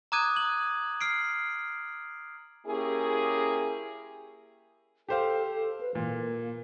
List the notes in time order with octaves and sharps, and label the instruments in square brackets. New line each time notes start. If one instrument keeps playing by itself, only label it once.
[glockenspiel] A#5 D6 D#6 F#6 G#6 D#7
F#7
F6 C7 D7
[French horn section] A#3 C#4 E4 G4 G#4
[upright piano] G4 C5 F5 [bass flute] A4
[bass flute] A4
B4
[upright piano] A#2 [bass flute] E3
[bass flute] A#3